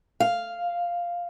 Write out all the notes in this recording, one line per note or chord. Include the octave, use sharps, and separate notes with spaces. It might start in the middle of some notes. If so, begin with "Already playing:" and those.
F5